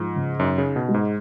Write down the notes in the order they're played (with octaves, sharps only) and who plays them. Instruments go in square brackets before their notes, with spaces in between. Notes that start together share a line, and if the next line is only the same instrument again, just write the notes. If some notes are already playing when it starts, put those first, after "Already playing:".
Already playing: [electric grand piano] G#2 [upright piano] F3
[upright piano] C#3
[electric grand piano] F#2 [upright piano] D#4
[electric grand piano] C#3
[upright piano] D#4
[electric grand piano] B2
[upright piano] G#3
[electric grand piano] G#2